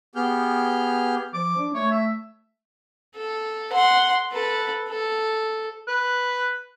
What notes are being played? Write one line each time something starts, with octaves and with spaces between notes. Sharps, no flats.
B3 G4 G#4 F6 G6
F3 D6
D4
A3 C#5
E5
A4
F#5 C6
A4 B4
A4
B4